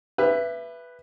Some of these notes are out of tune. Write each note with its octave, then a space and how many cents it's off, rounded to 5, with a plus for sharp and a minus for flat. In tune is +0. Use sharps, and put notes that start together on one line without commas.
G4 +35 B4 +0 E5 +20